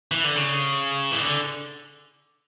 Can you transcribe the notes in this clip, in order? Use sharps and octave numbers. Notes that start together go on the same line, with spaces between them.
E3
D3
C#3
E3
D3